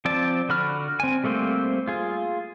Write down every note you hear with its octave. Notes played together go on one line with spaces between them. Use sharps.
F3 C4 D5 A5
D3 F#4 B5 F6
C4 G#5
G3 A3 A#3 C4 C5
F4 G#4